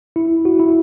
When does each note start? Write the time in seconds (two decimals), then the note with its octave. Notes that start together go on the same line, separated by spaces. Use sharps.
0.16 E4
0.45 F#4
0.59 E4